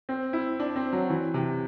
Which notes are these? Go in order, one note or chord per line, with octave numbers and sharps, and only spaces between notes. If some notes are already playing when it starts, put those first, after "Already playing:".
C4
E4
D4
C4
F#3
E3
C3